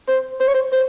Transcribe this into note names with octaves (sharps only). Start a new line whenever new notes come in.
C5
C5
C#5
C5
C5